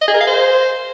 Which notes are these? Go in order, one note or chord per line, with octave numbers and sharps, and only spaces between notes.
D#5
G#4
A#4
F5
C5